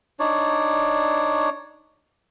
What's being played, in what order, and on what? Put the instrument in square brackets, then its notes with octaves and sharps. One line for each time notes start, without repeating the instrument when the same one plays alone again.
[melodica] D4 D#4 C#5 D5